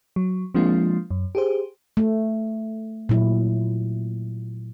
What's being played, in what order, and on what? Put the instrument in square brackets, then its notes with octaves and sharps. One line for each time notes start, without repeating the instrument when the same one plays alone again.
[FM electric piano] F#3
F3 G#3 A#3 C4 D4 F4
F#2
G4 G#4 C5
[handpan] A3
A#2 F#3 E4